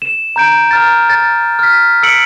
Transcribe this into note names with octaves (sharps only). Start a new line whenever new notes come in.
E7
A#5 G6 D7
A#5 F6 A6
A6
F6 B6
E6 F6 B6 C#7 D7 F#7